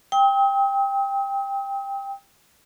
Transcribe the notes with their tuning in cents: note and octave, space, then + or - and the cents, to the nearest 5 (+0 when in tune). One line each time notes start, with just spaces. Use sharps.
G5 +15 D#6 +45